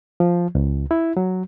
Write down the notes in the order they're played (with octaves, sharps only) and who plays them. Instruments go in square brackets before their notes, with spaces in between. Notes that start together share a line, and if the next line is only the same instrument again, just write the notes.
[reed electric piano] F3
C#2
E4
F#3